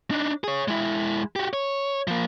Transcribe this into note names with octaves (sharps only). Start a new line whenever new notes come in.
D4 D#4
G#4 C#5
G#3 E4
F#4 G4
C#5
F3 A#3